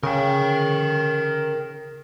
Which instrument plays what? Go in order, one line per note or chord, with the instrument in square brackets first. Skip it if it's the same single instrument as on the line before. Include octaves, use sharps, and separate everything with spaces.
[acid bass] C#3 [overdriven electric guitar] A#4 G5